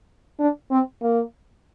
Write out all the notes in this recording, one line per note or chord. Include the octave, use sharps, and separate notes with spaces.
D4
C4
A#3